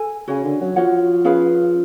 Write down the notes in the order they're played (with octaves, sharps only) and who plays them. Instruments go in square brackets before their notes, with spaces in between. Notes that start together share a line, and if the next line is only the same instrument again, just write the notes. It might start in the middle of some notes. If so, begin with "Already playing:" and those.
Already playing: [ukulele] A4 G#5
[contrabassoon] C#3 [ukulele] F#4 C#5 G#5
[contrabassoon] D3
F#3
[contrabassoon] F3 [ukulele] F#4 C#5 F#5
[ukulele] C#4 G#4 B4 F5